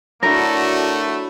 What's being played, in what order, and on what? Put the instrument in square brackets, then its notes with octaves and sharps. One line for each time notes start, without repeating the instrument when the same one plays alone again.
[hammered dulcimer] F#3 D4 E4 [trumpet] A3 [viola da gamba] F#4 A4 D5 [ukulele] A#4